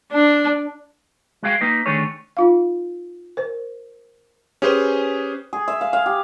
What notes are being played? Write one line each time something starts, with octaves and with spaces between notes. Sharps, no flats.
D4
G#3 F#4 G#4 F5 G5
A#3 D#4 B4 D#5
D3 D#3 A3 D4 G#4 C#5
D#4 F4 F5
A#4 C5
C#4 G4 G#4 B4 C5
G#4
E5
F5
F5
G4